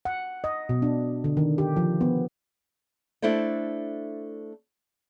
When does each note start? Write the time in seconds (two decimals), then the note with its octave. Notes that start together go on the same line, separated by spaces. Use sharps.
0.05 F#5
0.44 D#5
0.69 B2
0.82 D4
1.24 D3
1.37 D#3
1.58 G4
1.76 F3
2.01 B3
3.22 A3 D4 E4 A4 C5 D5